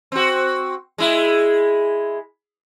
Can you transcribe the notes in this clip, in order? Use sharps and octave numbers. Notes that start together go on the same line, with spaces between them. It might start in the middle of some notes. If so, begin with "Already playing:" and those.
C4 F#4
G#3 E4